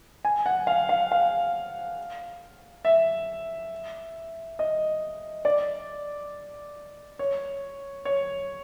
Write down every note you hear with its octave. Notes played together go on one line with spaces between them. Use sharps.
G#5
F#5
F5
F5
F5
E5
D#5
D5
C#5
C#5